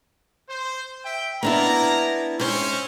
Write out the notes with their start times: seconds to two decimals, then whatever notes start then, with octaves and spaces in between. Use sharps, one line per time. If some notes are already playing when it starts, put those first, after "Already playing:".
0.50 C5
1.05 E5 G5
1.43 A#3 B3 D4 E4 A#5
2.40 G#2 C4 C#4 C5